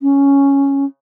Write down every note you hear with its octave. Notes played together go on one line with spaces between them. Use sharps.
C#4